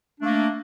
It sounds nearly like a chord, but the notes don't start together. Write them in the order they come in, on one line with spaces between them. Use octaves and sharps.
D4 A3 A#3